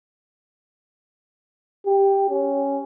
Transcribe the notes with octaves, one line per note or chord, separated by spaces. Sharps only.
G4
C#4